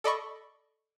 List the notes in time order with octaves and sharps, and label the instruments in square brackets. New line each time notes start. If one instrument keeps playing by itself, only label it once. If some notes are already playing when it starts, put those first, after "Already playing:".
[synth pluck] A4 D5 D#5 B5 C#6